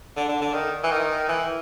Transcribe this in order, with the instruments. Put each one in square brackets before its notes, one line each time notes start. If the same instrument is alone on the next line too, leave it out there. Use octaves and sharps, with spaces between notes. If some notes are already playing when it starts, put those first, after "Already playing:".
[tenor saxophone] D3
D3
D3
D#3
E3
D#3
E3